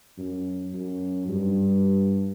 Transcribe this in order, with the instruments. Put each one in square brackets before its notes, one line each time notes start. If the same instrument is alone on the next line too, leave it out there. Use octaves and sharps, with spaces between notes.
[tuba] F#2
F#2
G2